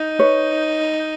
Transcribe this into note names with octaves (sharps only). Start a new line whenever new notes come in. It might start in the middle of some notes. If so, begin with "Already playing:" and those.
Already playing: D#4
B4 C#5